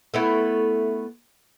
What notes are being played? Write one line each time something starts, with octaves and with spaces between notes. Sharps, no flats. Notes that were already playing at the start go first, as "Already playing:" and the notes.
A3 B3 E4